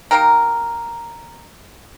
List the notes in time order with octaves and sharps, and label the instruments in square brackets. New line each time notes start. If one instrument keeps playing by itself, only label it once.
[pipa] A#3 D#4 G4 A#4